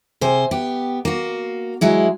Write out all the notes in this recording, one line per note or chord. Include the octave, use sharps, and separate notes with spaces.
C3 G#4 C5
B3 G4
A#3 F#4
F#3 G#3 E4